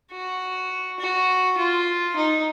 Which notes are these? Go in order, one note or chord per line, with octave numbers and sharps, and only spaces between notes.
F#4
F#4
F4
D#4